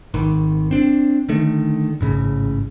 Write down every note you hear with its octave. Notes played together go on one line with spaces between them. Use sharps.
G#1 D#3
C4 D4
D3 D#3 A3
A1 G#2 C#3